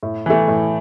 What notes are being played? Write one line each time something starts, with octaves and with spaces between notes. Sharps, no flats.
A2
E3 A3
A2